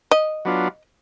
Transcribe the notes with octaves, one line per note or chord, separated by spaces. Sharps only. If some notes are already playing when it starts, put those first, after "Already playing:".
D#5
F#3 B3 D4 F4